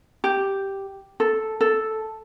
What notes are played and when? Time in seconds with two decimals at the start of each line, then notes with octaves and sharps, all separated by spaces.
0.24 G4
1.20 A4
1.61 A4